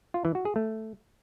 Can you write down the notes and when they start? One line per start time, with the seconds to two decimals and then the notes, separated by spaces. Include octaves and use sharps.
0.14 F4
0.25 E3
0.35 F#4
0.45 G#4
0.56 A3